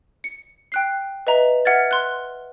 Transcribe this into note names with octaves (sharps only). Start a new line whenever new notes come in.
C#7
G5 F#6 C7
B4 D#5 E5 A#5
E5 F#5 F6 G#6 A6
C6 F#6